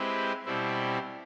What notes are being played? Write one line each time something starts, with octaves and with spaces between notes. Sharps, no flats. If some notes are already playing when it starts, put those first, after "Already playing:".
Already playing: G#3 C4 E4 G4 B4
B2 G3 C4 E4